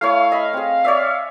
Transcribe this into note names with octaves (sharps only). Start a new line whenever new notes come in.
A3 E4 C#5 F5
D#5 B5
C4 G#4
C#5 D5 E5